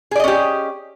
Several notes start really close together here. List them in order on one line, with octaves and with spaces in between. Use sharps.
G#4 D5 D#5 C#4 G4